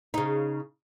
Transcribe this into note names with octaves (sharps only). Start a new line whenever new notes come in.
C#3 D#4